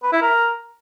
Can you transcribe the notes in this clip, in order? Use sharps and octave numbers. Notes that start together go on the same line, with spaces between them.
B4
E4
A#4